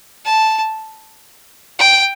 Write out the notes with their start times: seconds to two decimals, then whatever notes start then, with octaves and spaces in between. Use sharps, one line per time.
0.25 A5
1.79 G5